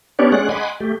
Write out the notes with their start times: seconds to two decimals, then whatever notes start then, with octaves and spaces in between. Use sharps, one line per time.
0.19 B3 C#4 D4 G4 C#5 D5
0.32 G#3 C#4 G#4 D5 F#5 F#6
0.49 D#5 F#5 G#5 B5 C6 D6
0.80 A3 G4